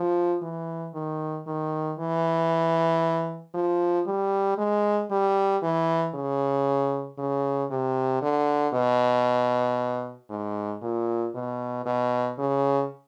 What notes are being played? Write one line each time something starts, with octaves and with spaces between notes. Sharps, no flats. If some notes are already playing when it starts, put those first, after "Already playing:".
Already playing: F3
E3
D#3
D#3
E3
F3
G3
G#3
G3
E3
C#3
C#3
C3
D3
B2
G#2
A#2
B2
B2
C#3